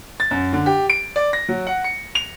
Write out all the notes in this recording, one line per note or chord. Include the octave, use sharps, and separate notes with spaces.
A6
F#2
D3
G4
D7
D5
A#6
F#3
F#5
C#7
F7